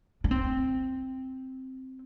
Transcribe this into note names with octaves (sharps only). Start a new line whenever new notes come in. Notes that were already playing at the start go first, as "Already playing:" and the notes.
D4
C4